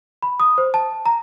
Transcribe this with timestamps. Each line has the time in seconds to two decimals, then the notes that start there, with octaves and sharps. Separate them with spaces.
0.23 B5
0.40 D#6
0.58 C5
0.74 A5
1.06 A#5